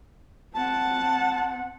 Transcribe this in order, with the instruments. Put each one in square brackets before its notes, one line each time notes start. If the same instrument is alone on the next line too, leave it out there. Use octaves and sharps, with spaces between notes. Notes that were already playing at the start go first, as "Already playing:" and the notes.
[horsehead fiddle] C4 F#5 [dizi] A5